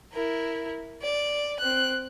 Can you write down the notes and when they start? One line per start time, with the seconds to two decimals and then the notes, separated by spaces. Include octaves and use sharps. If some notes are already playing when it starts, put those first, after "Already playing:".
0.12 E4 A#4
1.02 D5
1.59 C4 F#6